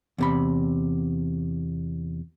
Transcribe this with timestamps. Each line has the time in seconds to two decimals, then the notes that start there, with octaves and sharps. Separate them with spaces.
0.18 E2 C3 B5